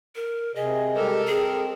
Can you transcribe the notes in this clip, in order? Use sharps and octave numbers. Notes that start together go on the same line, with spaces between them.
A#4
C3 G#4 D#5
G3 G#3 G4 A4 A#4
C4 G#4